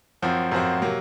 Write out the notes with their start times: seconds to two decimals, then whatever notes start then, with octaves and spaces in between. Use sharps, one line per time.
0.22 F#2 F3 C4 F#4
0.52 F#2 F3 C4 F#4
0.82 C3 F#3 A#3